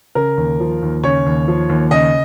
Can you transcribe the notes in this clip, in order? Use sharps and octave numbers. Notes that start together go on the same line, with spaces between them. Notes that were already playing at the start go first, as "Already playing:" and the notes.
C#3 A#4
D#2
F3
D#2
C#3 C#5
D#2
F3
D#2
C#3 D#5